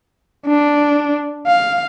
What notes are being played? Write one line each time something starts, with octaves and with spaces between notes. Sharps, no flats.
D4
F5